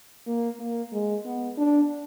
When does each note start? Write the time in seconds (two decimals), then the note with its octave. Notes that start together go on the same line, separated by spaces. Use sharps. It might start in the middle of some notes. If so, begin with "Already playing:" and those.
0.27 A#3
0.60 A#3
0.92 G#3
1.25 B3
1.58 D4